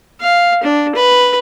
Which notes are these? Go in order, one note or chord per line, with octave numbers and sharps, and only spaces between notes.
F5
D4
B4